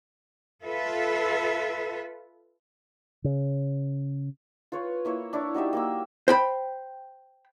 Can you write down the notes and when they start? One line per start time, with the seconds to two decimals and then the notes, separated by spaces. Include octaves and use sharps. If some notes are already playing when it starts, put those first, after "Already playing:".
0.63 F4 A4 B4 E5
3.24 C#3
4.72 F4 B4 C#5
5.05 A#3 E4 C#5
5.33 D4 E4 C#5
5.54 F#3 D#4 G4 E5
5.73 A#3 D6 E6
6.28 C5 G5 B5